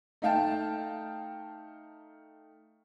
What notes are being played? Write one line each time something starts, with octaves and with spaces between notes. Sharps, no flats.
A3 D#4 F5 G5 A5